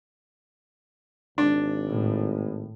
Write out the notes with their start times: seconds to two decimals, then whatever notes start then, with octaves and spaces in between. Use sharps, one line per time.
1.38 G#1 D4
1.88 A2